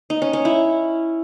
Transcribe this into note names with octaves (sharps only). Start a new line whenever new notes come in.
D#4
C#4
C#4
E4